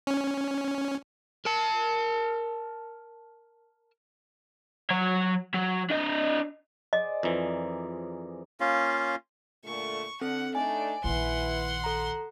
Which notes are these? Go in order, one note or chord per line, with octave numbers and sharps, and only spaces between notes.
C#4
A#4 A5
F#3 C#5
F#3
D4 D#5
G#4 C5 D5 D#5
F2 E3 A#4
A#3 C#4 F4 F5
A#2 D3 A3 C#6
D3 C4 A4 F#5
A3 D4 D#4 D5 G#5
A#1 D#3 E4 B4 F#5 C6
A4 A#5